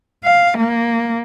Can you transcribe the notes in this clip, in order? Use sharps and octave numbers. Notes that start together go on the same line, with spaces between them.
F5
A#3